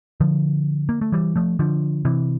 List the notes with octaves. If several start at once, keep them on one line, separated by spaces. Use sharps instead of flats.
D3 F3
A#3
A3
E3 G3
F3 A3
D3 F3
C3 E3